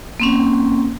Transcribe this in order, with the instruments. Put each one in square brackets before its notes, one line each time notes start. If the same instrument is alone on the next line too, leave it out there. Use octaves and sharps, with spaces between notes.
[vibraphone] A#3 C4 C#4